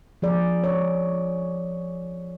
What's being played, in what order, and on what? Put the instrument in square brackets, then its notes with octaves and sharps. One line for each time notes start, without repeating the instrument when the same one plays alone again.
[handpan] F3 G#4 D5
C#5